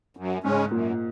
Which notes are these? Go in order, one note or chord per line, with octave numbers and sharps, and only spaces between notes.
F#2
G#2 C#3 G#3 C#4
F#2 A#2